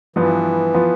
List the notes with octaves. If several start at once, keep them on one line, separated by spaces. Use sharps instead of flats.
G2 E3 F3 B3 F4
F3 B3 F4